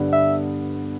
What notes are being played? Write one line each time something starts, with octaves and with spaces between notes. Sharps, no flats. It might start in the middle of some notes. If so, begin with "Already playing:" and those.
Already playing: G2 D3 G3 B3
E5